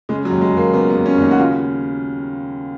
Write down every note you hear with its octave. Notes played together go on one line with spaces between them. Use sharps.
C#3 G#3
F#3
D#2
G#3
D#2 A#3
C#3 B3
B3
D#2
C#4
D#2 D#4
F#4
C#3 F4